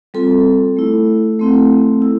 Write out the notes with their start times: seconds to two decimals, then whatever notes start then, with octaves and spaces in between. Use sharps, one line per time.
0.14 G3 C4 F4 A4
0.77 A3 E4
1.39 A3 C4 E4
2.02 E4